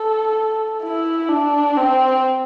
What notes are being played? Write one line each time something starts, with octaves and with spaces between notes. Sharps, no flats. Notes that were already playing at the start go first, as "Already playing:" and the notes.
Already playing: A4
E4
D4
C4